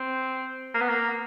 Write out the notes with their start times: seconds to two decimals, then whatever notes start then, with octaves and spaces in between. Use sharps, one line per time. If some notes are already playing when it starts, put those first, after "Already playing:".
Already playing: C4
0.74 A#3
0.81 B3
0.89 A#3